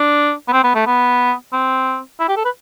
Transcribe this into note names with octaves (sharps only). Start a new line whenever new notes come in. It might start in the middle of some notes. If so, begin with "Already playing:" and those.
Already playing: D4
B3
C4
B3
A3
B3
C4
E4
G4
A4
B4